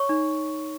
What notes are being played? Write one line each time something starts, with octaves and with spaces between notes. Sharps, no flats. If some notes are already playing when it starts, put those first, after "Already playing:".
Already playing: C#5 C#6
D#4